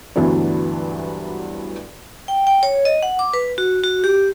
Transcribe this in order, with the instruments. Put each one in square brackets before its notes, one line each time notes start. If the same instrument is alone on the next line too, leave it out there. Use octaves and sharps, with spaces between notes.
[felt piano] D2 G2 E3 F#3 B3 D4
[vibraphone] G5
G5
C#5
D#5
F#5
D6
B4
F#4
F#4
G4